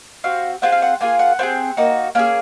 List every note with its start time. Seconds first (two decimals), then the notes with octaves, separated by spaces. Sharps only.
0.24 C4 F#4 F5
0.62 C4 F4 G#4 F#5
0.72 F5
0.82 F#5
1.01 A#3 F4 G#4 G#5
1.19 F#5
1.39 C4 F4
1.43 G#4
1.77 A#3 D#4 F#4
2.15 A#3 C#4 G#4 G#5